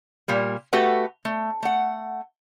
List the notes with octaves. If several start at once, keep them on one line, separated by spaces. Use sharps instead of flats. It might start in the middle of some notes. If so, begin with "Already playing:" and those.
A#2 G3 A#3
A3 F#4 G4 A4 B4 F#5
A3
A3 F#5